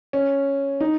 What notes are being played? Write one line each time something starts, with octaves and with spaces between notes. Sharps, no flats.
C#4
D#4